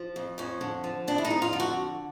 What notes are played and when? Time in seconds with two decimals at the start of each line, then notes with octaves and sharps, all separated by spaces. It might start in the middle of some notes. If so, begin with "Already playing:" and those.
Already playing: F3
0.16 F2
0.38 F2 C#4
0.61 D3
0.84 F3
1.08 F2 D4
1.18 E4
1.25 D#4
1.30 F2
1.42 F4
1.53 D3
1.60 F#4